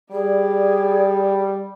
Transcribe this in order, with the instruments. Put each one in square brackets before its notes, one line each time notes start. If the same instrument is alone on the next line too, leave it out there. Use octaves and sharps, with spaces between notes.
[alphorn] G3 [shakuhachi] G#4 [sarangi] D5